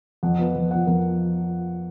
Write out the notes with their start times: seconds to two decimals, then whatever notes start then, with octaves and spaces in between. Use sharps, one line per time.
0.23 F2 F#5
0.39 F3 B3
0.55 F2
0.71 F3 B3 F#5
0.87 F2 A#4